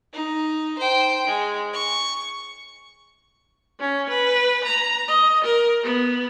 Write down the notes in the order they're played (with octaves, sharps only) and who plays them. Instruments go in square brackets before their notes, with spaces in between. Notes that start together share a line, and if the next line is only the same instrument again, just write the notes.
[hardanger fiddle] D#4
C5 G5
G#3
C#6
[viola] C#4
B4
A#5
D#5
A#4
B3